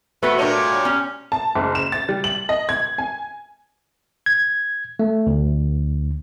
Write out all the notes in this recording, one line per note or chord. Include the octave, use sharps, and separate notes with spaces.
C3 A3 F#4 B4
A#2 G3 D4 G4 C#5 D#5
C#4
A5
F#1
E7
A6
G3
F#7
D#5
G#6
G#5
G#6
A3
D2